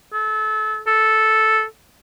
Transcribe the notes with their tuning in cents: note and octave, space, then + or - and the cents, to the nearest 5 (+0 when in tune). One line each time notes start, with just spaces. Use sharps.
A4 -30
A4 -5